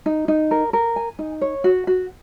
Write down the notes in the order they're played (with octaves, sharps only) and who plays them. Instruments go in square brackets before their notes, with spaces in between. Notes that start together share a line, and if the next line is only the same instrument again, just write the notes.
[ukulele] D#4
D#4
A#4
A#4
G#5
D#4
C#5
F#4
F#4